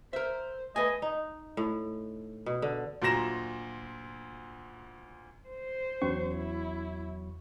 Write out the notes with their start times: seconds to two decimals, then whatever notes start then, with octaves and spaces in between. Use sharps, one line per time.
0.13 A#4 C5 E5
0.76 A3 B4 D#5 G#5
1.02 D#4
1.57 A2
2.46 B2
2.62 D3
3.02 D2 A#2 F#3 A#5 A#6 E7
5.49 C5
6.02 E2 F#3 C#4 C#6
6.36 E4